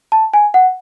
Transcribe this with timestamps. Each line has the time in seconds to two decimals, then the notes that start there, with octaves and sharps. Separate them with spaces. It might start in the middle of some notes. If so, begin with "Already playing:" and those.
0.12 A5
0.33 G#5
0.54 F#5